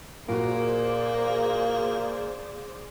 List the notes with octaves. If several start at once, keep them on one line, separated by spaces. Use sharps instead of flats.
A#2 A#3 F#4 G#4 C5 D5